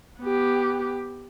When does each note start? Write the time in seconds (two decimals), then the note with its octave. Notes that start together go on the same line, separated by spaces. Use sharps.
0.20 B3 G4